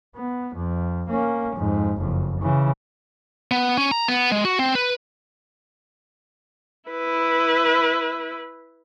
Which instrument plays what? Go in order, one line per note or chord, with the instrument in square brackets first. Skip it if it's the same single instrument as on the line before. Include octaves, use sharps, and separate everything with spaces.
[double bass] B3
F2
A#3 C#4
F2 G#2
F#1 F2
C#3 E3
[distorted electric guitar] B3
C#4
A#5
B3
G#3
F#4
C4
B4
[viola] E4 B4